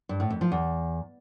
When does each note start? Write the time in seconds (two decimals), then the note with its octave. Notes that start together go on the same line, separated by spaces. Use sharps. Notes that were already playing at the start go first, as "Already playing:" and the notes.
0.09 G2
0.20 A2
0.30 F2
0.41 F3
0.52 E2